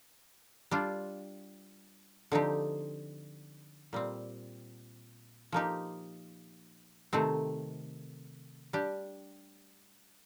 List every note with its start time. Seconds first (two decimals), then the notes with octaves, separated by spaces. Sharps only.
0.71 G3 D4 F4
2.32 D3 F3 C4 D#4 G4
3.93 A#2 G3 C4
5.52 F3 A#3 D#4 G4
7.13 C3 D#3 A3 C4
8.73 G3 D4 G4